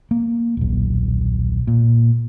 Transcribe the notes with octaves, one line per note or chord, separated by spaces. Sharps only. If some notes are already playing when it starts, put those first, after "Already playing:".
A#3
D#1 B1
A#2